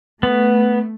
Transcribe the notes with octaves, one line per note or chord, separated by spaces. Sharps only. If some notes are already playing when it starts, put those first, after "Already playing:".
A3 B3